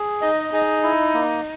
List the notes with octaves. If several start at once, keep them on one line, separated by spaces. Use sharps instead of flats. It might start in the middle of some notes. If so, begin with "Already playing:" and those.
Already playing: G#4
D#4 D#5
D#4 G#4
E4
A#3